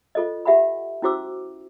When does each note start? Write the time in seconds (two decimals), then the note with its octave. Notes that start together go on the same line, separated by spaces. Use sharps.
0.15 F4 A4 C5 D#5
0.45 G4 E5 F#5 G#5 B5
1.02 C#4 E4 F#4 C5 D6 E6